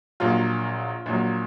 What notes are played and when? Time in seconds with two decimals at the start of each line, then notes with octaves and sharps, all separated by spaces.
0.20 A#1 A#2 F#3 F4
1.06 A#1 A#2 F#3